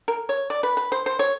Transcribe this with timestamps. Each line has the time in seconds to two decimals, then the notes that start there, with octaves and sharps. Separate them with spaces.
0.08 A#4
0.29 C#5
0.50 D5
0.63 B4
0.77 B4
0.92 C5
1.06 C5
1.19 C#5